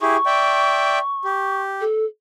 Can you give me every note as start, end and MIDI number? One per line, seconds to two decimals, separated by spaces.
0.01 0.17 64
0.01 0.17 67
0.01 0.17 68
0.01 1.62 85
0.26 0.99 74
0.26 0.99 76
0.26 0.99 79
1.25 1.84 67
1.81 2.05 69